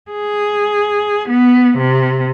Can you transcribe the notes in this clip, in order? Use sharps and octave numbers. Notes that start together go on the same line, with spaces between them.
G#4
B3
C3